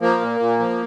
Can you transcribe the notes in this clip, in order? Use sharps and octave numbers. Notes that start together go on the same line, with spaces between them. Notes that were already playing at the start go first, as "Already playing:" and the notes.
F3 A#3
A#2
A#2
F3